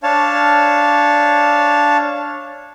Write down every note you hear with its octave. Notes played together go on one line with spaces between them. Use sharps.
D4 C#5 F5 A5